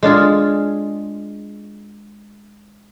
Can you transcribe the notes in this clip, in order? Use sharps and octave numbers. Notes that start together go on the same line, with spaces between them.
G#3 D4 F4 G#4